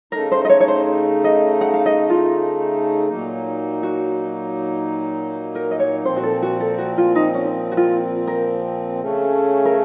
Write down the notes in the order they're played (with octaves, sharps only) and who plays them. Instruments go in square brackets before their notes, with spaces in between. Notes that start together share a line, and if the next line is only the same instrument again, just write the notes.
[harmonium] C#3 A3 D#4 [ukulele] A#4
[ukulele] C5
D#5
C#5
C#5
C5
D#5
F#5
F5
D#5
F4
[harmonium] A#2 F#3 A#3 D#4
[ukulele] F#4
A#4
D#5
C#5
[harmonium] A#2 F3 C4 [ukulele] C5
[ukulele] F#4
A4
F#4
A4
F#4
F4
D#4
C#4
F#4
F4
A#4
[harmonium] C#3 A3 C#4
[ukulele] A#4